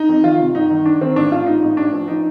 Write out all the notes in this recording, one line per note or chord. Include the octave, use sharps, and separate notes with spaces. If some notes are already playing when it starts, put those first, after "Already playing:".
Already playing: D#4
F2
D#3 F4
C3
G1 D#4
D#3
D#3 D4
D#3 C4
A1 D4
A1 F4
A1 D#4
A1
A1 D4
F3
F3 D#4